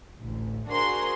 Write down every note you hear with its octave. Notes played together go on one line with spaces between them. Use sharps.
A1 D2
D4 F#4 G#4 A#4 C5 C6